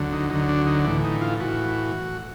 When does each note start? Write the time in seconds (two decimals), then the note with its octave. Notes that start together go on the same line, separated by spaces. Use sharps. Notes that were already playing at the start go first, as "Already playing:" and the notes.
Already playing: D2 D3 F#3
0.13 D#4
0.30 D2 D3 F#3 D#4
0.49 D4
0.67 D#4
0.85 A2 E3 D4
1.04 D#4
1.21 F4
1.40 A2 E3 F#4